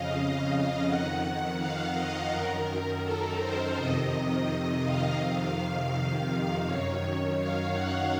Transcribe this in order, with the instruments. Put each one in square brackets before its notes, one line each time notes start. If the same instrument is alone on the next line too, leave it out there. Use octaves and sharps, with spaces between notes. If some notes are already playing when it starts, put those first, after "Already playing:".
Already playing: [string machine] F2 C#3 D#5 F5
F2 D#3 F#5
F5
D#5
F#2 D#3 A#4
A4
C5
F2 C3 D#3 D#5
F5
F2 C3 D#3
F5
F#2 D#3 C#5
F5
F#5